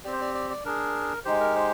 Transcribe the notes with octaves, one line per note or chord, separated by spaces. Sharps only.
C4 G4 D5
C5
D5
D5
D5
D4 G#4 A#4
G#3 D#4 G4 C5
A#4
C5